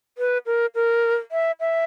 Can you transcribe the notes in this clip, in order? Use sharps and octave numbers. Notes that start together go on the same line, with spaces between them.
B4
A#4
A#4
E5
E5